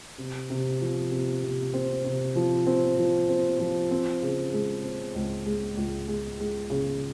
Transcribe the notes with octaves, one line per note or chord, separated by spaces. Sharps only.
C3
C3
F3
C3
C3
C4
C3
F3
C4
F3
C4
F3
C4
C#3
G#3
C4
C#2
G#3
C#2
G#3
G#3
C#3